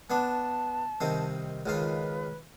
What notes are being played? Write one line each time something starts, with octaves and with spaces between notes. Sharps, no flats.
B3 D4 A5
C2 D#3 C4
C#2 D#3 F4 B4